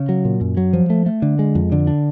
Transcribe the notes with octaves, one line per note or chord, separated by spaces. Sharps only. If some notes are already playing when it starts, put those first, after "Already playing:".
Already playing: C#3
F#3
A#2
F#2
F#3
F3
A3
A3
D3
G#3
F2
D3
D4